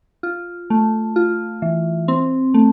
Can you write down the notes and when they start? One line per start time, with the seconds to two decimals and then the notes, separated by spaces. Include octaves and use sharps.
0.23 F4
0.70 A3
1.16 F4
1.62 E3
2.08 C4
2.54 A3